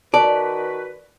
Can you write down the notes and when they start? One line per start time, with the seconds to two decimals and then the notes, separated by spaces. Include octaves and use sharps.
0.14 D#3 F#4 B4 D5 A5